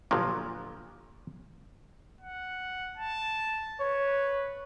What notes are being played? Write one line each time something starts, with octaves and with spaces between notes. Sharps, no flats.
G1 A#2 F3 F#3
F#5
A5
B4 C#5